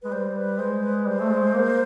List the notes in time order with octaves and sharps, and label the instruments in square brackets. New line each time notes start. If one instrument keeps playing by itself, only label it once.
[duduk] G#3 [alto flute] B4
[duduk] G3 [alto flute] C5
[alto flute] B4
[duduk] G#3 [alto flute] C5
[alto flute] B4
[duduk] G3 [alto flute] C5
[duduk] A3
G#3
A#3